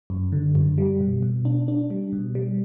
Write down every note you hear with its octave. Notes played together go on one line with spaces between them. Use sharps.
F#2
D3
F#2
G3
B2
B2
D4
D4
G3
B2
G3